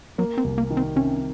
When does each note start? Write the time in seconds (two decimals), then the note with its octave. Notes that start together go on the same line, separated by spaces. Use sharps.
0.18 F#3 A#3
0.38 C4
0.44 C2
0.58 A#3
0.70 D#3
0.77 C4
0.96 C3 C#4